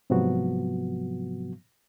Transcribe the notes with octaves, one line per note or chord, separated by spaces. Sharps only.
G#2 C3 F3 F#3 B3 F#4